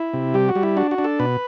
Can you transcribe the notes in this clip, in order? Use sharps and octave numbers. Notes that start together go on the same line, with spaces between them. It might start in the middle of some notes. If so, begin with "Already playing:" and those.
Already playing: E4
C3
G3 G4
F#4
G3
E4
D4 F#4
F#4
D4
A4
B2 B4